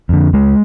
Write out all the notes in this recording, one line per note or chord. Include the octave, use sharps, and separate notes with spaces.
F2 D3
C#2 G#3